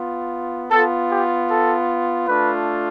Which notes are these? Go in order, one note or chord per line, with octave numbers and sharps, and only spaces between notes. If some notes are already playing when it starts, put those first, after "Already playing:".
Already playing: B3 F4
B3 F4 A4
G4
A4
A3 D4 F4 B4